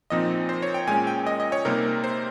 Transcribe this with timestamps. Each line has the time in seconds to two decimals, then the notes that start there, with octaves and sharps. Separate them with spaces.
0.10 A#2 F3 C4 D#4 D#5
0.49 C5
0.62 C#5
0.74 G5
0.87 A#2 G#3 C#4 G#5
1.07 G5
1.27 D#5
1.40 D#5
1.52 C#5
1.65 C3 G3 A#3 D#4 A#4
2.04 C5